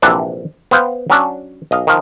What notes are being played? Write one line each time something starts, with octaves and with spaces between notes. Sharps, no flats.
A#1 C3 E3 D4 F#5
B3 C5 F5 G5
F#3 C#4 D4
B1 D#5 F5
D#3 F3